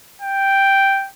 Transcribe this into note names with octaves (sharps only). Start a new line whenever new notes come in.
G5